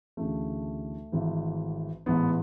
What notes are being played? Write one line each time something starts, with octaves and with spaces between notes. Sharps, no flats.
D2 C#3 E3 A3
G#1 G#2 E3
A1 G#2 E3 B3